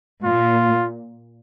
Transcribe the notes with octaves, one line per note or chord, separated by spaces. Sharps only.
A#2 F4